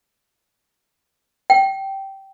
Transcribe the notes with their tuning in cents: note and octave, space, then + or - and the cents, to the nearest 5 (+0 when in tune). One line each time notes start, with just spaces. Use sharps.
G5 -15